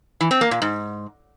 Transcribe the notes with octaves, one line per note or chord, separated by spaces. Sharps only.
E3
C4
A#3
A#2
G#2